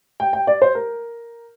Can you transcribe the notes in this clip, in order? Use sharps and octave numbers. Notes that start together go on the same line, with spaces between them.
G5
G5
D5
C5
A#4